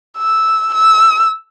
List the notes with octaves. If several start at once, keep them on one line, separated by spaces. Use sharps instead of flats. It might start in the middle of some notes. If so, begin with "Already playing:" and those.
E6
E6